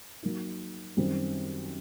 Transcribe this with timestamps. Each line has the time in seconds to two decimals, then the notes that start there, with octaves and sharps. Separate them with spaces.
0.23 F#3 A#3 D#4
0.97 F#2 D#3 G3 C4